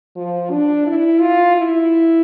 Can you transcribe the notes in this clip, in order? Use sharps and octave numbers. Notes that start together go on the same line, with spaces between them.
F3
D4
E4
F4
E4